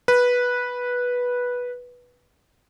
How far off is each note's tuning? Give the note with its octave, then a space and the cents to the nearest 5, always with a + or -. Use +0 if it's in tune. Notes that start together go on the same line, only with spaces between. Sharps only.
B4 -10